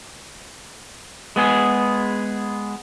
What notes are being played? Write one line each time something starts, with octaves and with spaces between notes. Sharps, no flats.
G#3 B3 G#4